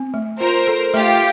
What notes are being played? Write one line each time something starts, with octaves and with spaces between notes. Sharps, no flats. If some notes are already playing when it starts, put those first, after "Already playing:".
Already playing: C4
A3
F4 A#4 C5
A4
A3 F4 G4